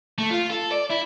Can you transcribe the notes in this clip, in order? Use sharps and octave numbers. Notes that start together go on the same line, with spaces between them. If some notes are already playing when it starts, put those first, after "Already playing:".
A3
F4
A4
D5
E4